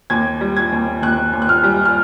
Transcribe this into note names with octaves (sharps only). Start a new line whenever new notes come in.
D#2 G#6
G3
G#6
D#2
D#2 F#6
D#2
F#6
F6
G3
F6